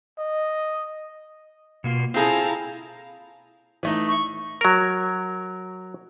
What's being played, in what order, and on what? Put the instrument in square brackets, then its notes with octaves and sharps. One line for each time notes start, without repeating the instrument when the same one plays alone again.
[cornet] D#5
[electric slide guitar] B2 A#3 F4
[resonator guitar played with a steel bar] C4 G#4 A4 [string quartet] E4 F5 A#5 [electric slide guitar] F4
[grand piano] E3 A3 D#4
[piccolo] C#6
[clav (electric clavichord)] F#3 A#4